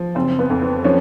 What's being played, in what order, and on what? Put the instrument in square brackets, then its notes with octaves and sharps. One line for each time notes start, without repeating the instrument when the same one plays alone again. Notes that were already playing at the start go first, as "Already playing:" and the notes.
Already playing: [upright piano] F3
[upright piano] F#1 [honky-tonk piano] C4
[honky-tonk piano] B3
[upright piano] F2
[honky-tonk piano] C4
[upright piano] F3 [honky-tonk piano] C#4